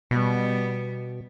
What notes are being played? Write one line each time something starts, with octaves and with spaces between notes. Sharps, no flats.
B2 G3 B3